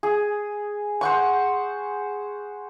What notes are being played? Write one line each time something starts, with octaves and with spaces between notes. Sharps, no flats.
G#4
C5 F#5 C#6